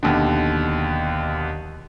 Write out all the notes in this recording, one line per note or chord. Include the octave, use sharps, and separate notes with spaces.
D#2 B2 D3